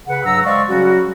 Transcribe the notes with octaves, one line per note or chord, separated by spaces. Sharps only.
C#3 B4 F#5
G2 F#3 F#5 A#5 E6
G#3 C5 D5 F5 C#6
C#3 F#3 G3 C#4 F#4